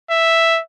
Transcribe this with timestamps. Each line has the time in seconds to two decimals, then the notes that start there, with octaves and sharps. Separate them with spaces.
0.11 E5